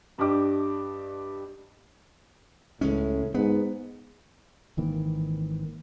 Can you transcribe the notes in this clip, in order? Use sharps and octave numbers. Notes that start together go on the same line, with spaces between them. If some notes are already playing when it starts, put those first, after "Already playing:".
G2 D4 G4 D#5 D6
C#2 A2 G#3 C#4
G#2 B3
G#1 D#3 E3 A#3